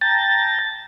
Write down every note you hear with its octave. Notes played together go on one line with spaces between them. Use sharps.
G5 A5 A#5 A6